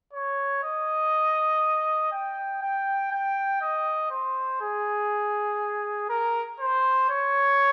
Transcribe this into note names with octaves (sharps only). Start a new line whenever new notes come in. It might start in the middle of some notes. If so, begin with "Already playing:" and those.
C#5
D#5
G5
G5
G5
D#5
C5
G#4
A#4
C5
C#5